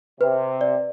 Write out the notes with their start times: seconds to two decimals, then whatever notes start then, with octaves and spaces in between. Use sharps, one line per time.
0.20 C3 B4
0.61 D5